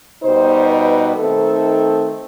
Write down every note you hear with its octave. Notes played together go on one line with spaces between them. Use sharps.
B2 G3 D#4 C5
B4
D#3 A3 C4 D#4 A4